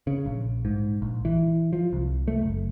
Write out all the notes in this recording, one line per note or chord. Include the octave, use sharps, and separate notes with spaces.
C#3
A#1
G#2
A#1
E3
F3
C2
A3
F#1